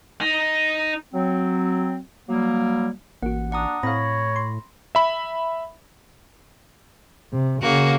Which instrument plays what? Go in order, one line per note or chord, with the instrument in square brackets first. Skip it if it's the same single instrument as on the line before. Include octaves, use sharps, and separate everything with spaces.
[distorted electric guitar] D#4
[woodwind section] F#3 C4
F#3 G3 A#3
[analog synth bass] A1 [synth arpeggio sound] A#3 F#4 [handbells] F#5
[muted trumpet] D4 [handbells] F#5 A#5 D#6
[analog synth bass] A2 [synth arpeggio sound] C4 F5 [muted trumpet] C#5 [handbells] B5 A#6
[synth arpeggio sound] C6
[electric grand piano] E5 B5
[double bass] C3
[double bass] C#3 [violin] A#3 F#4